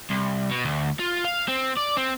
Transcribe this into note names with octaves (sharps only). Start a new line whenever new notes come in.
C2
B2
D2
F4
F5
C4
D5
C4